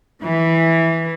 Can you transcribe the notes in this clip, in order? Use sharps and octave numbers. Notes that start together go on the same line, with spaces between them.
E3